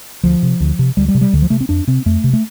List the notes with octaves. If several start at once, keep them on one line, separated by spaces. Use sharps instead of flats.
D2 F3
C3
D2
C3
D2 G3
G3
C3
G3
D2 D3
F3
C3 A3
C4
F2 D4
C3 C4
F2 A3
C3
A3